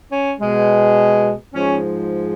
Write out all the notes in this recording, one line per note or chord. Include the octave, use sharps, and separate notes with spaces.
C#4
B2 G#3
G#2 F3 G#3 C#4